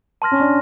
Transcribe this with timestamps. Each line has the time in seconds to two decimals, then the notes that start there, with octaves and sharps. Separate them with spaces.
0.22 A5 C6 F6 A#6
0.32 C#4
0.40 D4